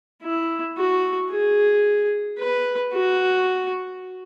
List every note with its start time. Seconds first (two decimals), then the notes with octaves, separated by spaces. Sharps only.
0.23 E4
0.78 F#4
1.31 G#4
2.39 B4
2.94 F#4